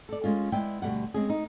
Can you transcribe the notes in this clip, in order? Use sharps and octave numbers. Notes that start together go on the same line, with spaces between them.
A4 D5
G#3 C#4 F4
G#3 B3 E4 D5 G5
D2 B2 G3 A#3 F#5
G#3 C4 C#4 G#4
D#4